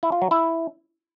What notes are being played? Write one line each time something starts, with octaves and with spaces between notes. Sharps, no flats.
E4
F4
F#3
E4